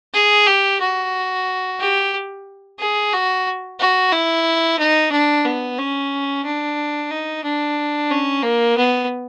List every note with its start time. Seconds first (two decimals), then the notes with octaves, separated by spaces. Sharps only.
0.14 G#4
0.47 G4
0.81 F#4
1.80 G4
2.79 G#4
3.13 F#4
3.80 F#4
4.12 E4
4.79 D#4
5.12 D4
5.45 B3
5.78 C#4
6.45 D4
7.11 D#4
7.44 D4
8.10 C#4
8.43 A#3
8.77 B3